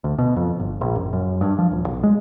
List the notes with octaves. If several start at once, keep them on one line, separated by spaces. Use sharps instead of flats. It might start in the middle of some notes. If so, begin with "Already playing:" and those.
D2
B2
F2
G1
A#1
F#1
F#2
G2
F3
D#1
B1
G#3